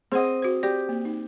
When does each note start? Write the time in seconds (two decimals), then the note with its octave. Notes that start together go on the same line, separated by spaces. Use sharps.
0.12 C4 G#4 C5 D#5 F#5
0.42 F#4 C5
0.63 G4 D5
0.89 A#3
1.05 D#4